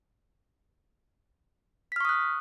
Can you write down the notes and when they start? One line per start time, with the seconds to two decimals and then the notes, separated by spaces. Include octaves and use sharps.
1.92 B6
1.96 F6
2.00 C#6
2.05 D#6
2.09 F#6